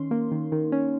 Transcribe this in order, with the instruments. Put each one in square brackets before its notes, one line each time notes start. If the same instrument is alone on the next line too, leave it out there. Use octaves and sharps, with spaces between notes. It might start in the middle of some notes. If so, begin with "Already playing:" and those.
Already playing: [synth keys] D#3 C#4 C6
A#3
D#3
D#3
C#4